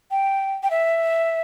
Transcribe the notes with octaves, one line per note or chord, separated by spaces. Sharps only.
G5
G5
E5